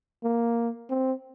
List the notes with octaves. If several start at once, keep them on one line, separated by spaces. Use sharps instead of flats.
A#3
C4